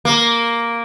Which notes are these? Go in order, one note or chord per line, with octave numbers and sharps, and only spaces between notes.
A#3